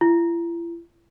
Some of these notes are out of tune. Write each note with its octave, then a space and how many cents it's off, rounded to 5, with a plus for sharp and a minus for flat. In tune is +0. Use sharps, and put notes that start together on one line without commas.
E4 +45